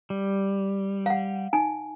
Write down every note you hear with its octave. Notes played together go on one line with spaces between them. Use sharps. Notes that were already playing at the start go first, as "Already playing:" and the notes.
G3
F5 F#5
D#4 G#5